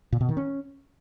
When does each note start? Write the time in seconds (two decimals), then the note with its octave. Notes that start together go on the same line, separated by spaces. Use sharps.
0.12 A#2
0.21 B2
0.29 D#3
0.37 C#4